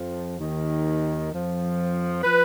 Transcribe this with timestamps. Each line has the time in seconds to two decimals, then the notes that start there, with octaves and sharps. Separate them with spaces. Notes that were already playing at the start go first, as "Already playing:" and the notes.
Already playing: F2 F3
0.37 D#2 D#3
1.30 F2 F3
2.23 F3 B4